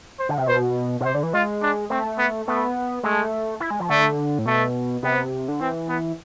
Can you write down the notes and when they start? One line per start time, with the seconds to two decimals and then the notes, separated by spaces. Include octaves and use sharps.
0.19 C5
0.29 D3
0.38 C3
0.47 B2 C5
1.01 B2
1.04 C3 C5
1.15 D3
1.23 E3
1.34 G#3 F4
1.62 D4
1.90 A3 C4
2.18 B3
2.47 A3 B3
3.03 G#3 A3
3.60 E4
3.71 G#3
3.80 F3
3.90 D3 A3
4.39 A2
4.46 B2 A3
5.03 C3 B3
5.48 D3
5.60 E3 C4
5.89 B3